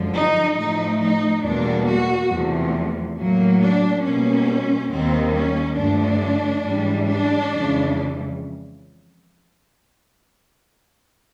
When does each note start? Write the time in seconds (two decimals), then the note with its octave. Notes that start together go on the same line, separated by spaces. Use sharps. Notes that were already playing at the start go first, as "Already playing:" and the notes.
Already playing: F#2 D3 F3 G#3
0.13 D#4
0.56 A2 F3 A3 D#4
1.00 D#4
1.43 E2 B2 G3 A#3 D4
1.87 F#4
2.30 E2 C3 F3 A3
3.17 A2 F#3 A#3
3.61 D4
4.03 B2 G3 A#3 C#4
4.91 D#2 D#3 G3 A#3 C4
5.34 C#4
5.77 G2 D3 F3 A3 D4
6.64 G#2 E3 G3
7.08 D4
7.50 F2 C#3 E3 G#3